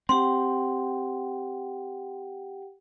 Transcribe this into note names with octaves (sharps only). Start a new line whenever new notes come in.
C4 G4 F#5 G5 C6